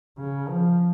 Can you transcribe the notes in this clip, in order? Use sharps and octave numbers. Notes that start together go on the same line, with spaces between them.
C#3
F3